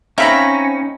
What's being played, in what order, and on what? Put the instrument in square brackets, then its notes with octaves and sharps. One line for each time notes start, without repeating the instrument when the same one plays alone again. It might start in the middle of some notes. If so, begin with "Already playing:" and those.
[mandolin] C4 A#5 [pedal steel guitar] C#4 [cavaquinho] D#4 B5 [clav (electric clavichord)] E5 F5